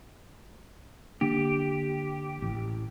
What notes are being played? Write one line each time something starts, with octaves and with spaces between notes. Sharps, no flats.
D3 A#3 D4 G4
A1